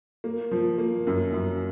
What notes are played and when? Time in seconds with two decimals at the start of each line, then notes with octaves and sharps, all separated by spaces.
0.24 A#3
0.51 F3
0.78 A#3
1.07 F#2
1.33 F#2